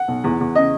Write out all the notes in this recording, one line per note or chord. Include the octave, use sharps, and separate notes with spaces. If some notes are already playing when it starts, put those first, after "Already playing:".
Already playing: F#5
B1
E2
E2
C#3 D#5